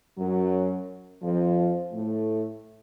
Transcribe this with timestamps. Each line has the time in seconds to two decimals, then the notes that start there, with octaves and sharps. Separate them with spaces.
0.17 F#2 F#3
1.22 F2 F3
1.92 A2 A3